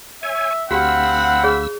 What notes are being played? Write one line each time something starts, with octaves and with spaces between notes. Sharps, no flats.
C#5 E5 G#5
D2 C4 F#4 G4 F5 F#5 B5 E6
G#4 C#5